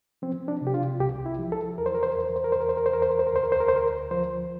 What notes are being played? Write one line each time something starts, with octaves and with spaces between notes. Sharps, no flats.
F3 C4
D4
C3
G4
F4
C2 G4
E4
F3
A4
E2 A#4
C5
A#4
C5
A#4
E2 C5
A#4
C5
A#4
C5
E2 A#4
C5
A#4
C5
E2 A#4
C5
A#4
C5
A#4
D2 C5
A#4
C5
A#4
C5
D2 A#4
F3 C5